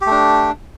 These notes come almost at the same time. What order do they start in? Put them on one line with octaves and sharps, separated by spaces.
G4 A3 D4